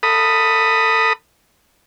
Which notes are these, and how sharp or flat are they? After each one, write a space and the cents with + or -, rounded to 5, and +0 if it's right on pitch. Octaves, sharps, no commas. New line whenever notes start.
A4 +30 B5 +0 D#6 +0